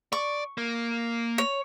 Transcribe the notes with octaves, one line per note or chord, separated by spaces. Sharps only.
D5 C#6
A#3
C#5